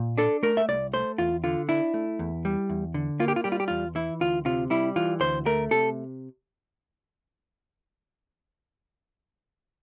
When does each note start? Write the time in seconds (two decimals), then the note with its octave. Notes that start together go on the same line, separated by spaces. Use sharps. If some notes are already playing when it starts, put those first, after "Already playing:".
Already playing: A#2
0.18 D4 A4
0.43 A3 A#4
0.57 E5
0.68 C2 D5
0.93 A3 C5
1.18 E2 F4
1.44 D3 F4
1.69 D4 E4
1.94 A3
2.19 E2
2.45 G3
2.69 E2
2.94 D3
3.20 A#3 F4
3.28 G4
3.36 F4
3.44 G3 G4
3.52 F4
3.60 G4
3.68 E2 F4
3.95 E3 E4
4.20 D2 F4
4.45 C3 F4
4.70 G3 E4
4.96 E3 F4
5.21 D2 C5
5.46 A3 A#4
5.71 C3 A4